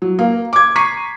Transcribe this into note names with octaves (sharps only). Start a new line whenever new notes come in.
F#3
A#3
D6 G#6
A#5 C#6 B6 C7 D#7